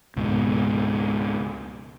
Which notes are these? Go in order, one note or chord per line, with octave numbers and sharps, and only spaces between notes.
C#2 G#2 B2